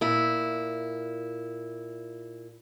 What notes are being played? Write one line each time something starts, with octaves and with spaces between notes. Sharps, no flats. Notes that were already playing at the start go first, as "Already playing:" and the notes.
A#2 E4